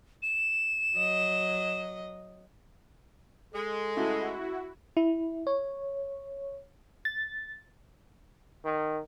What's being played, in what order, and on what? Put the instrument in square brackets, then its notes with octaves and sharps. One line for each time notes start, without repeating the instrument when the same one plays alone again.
[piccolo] E7
[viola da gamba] F#3 D#5
[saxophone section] G#3 [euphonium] A4
[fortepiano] C#3 A3 [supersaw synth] E4 F#4
[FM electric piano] E4
C#5
A6
[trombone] D#3